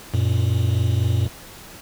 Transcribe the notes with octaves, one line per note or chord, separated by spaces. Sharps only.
F#2 A#2